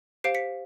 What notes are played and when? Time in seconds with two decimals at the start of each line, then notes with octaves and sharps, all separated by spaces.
0.24 G4 C5 F5 C7 D7
0.35 B6 C#7